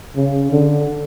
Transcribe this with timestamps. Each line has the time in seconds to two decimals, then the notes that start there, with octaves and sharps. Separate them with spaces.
0.16 C#3
0.52 D3